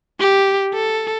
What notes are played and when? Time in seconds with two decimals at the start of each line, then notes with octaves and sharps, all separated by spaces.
0.20 G4
0.74 A4